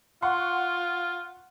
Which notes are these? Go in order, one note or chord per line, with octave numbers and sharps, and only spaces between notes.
F4 F#5 C6 C#6